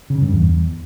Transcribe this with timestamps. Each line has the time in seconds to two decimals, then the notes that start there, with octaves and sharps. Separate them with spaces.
0.10 C#3
0.21 G2
0.33 E2